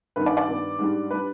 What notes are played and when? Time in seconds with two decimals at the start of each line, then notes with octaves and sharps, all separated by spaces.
0.16 G2 D#3 B3 B4
0.26 D5
0.37 D5
0.48 G2 D#3 B3
0.79 G#2 G3 D4
1.10 G3 D4 B4